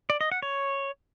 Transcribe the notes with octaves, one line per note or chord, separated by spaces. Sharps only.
D5
D#5
F#5
C#5